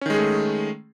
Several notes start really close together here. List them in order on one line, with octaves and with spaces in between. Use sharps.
C#4 D#3 G#3 G#4 A3